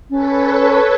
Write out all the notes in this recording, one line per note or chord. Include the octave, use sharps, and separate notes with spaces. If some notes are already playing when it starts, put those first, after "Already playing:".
C#4 A4 B4 C#5